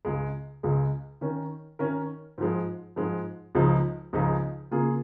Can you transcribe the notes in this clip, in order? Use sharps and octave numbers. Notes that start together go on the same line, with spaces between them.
C#2 C#3 G#3
C#2 C#3 G#3
D#3 C#4 A#4
D#3 C#4 A#4
G#2 F3 G#3
G#2 F3 G#3
C#2 C#3 F3 G#3 D#4
C#2 C#3 F3 G#3 D#4
C#3 A#3 F4 G#4